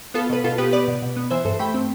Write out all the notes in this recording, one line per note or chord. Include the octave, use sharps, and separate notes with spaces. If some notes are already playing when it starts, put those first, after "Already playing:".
B3 F4 A4
B2 B4
B2 F4 A4
B3 G4 B4
B3 B4 D5
B2
B2
B3
E3 C5 E5
G2 A4 C5
A3 G5 B5
C4